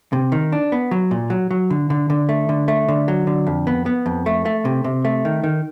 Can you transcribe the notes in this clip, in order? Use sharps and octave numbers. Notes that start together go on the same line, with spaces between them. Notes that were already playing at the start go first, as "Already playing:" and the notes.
C3
D#3
D4
B3
F#3
A#2
F#3
F#3
D3
D3
D3
A3
D3
A3
D3
F#3
D3
F2
B3
B3
F2
A3
A3
C3
C3
A3
D#3
D#3